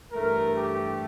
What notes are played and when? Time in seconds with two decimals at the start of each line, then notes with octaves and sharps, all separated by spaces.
0.12 G2 E3 A3 A#4
0.56 G4